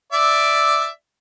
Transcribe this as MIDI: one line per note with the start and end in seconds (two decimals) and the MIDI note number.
0.12 0.88 74
0.12 0.88 76